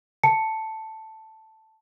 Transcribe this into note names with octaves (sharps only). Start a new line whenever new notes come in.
A5 C#7